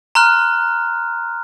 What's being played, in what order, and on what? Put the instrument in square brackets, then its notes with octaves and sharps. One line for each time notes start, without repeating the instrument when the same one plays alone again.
[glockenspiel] A#5 C6 F6 F#6